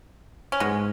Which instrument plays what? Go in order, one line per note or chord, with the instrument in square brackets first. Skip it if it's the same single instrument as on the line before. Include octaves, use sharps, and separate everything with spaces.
[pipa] C#4
[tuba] G#2 [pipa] G#3 B3